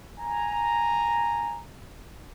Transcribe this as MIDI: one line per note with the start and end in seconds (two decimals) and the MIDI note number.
0.18 1.60 80
0.18 1.60 82